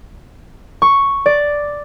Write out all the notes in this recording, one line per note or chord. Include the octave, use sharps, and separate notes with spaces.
C#6
D5